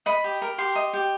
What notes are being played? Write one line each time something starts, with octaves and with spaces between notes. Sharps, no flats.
D#5 B5
G4
A#4
G4 C6
D#5
G4